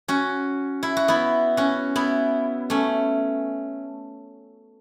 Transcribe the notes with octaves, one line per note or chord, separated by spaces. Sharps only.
C#4 F#4
E4
F#4
B3 E4
C#4 F#4
B3 E4
A3 C#4